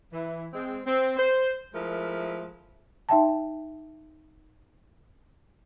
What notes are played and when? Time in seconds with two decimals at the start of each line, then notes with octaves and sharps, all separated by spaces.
0.11 E3
0.52 G#3 C4
0.86 C4
1.17 C5
1.73 F3 G#3 A3 E4 A#4
3.09 D#4 E5 G5 A5